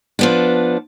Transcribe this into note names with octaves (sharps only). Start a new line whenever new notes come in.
F3 B3 D4